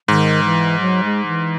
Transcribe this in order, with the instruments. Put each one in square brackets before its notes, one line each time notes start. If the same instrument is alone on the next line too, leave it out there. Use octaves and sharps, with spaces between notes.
[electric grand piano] G#2 [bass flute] D#3
[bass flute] E3
F#3
G#3
E3